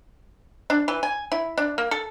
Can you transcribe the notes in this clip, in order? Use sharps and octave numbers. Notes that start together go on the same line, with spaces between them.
D4
E3
G#5
E4
D4
A#3
A4